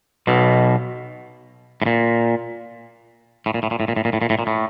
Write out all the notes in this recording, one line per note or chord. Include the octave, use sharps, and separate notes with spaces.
B1 B2
A2
A#2
A2
A#2
A2
A#2
A2
A#2
A2
A#2
A2
A#2
A2
A#2
A2